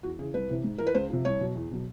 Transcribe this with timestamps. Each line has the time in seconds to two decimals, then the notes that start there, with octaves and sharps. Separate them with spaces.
0.03 E2 F#4
0.19 C#3 E3 G#4
0.34 C2 B4
0.49 C3 E3
0.64 G#2
0.78 E3 A#4
0.87 B4
0.95 C#2 C5
1.10 C3 F3
1.25 C2 C#5
1.41 B2 F#3
1.55 E2
1.71 B2 F#3